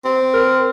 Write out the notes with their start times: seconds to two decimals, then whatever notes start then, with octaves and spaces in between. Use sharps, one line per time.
0.05 C4
0.33 A#4